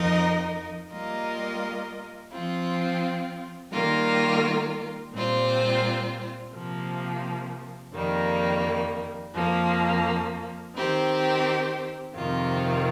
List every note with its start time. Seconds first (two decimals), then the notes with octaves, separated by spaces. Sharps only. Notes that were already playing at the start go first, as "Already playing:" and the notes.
Already playing: F2 F3 D#4 A#4 D#5
0.92 G3 A#3 F4 A#4 D#5
2.32 F3 C4 F4
3.73 D#3 G3 A#3 F4 A#4
5.13 A#2 G3 C4 F4 C5
6.53 C3 F3 A#3
7.93 F2 D#3 G3 A#3
9.34 F2 F3 A#3
10.75 D#3 C4 G4 C5
12.15 F2 C3 D#3 C4 F4